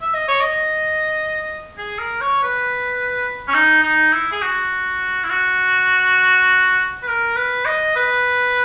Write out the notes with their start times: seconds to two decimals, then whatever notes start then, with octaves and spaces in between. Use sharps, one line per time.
0.01 E5
0.14 D#5
0.28 C#5
0.41 D#5
1.78 G#4
1.99 A#4
2.21 C#5
2.43 B4
3.48 C#4
3.54 D#4
3.83 D#4
4.13 E4
4.32 G#4
4.42 F#4
5.24 E4
5.30 F#4
7.03 B4
7.08 A#4
7.36 B4
7.65 D#5
7.96 B4